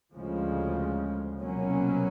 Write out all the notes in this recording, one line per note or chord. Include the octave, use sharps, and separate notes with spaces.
D2 C#3 F3 G#3
C2 B2 F#3 A#3 C#4